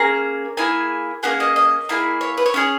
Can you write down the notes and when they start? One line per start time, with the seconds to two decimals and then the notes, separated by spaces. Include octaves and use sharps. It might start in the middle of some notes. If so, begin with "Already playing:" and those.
Already playing: A#3 C#4 G#4 A#5
0.57 A#3 E4 G#4 G#5
1.23 A#3 C#4 G#4 F#5
1.40 D#5
1.56 D#5
1.89 A#3 E4 G#4
2.21 C#5
2.38 B4
2.46 C#5
2.54 C#4 E4 G#4